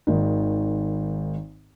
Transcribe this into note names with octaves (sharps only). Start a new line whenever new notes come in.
G#1 D#3